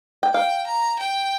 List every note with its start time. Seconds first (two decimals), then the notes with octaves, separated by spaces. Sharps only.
0.23 G5
0.34 F5 G5
0.67 A#5
0.99 G5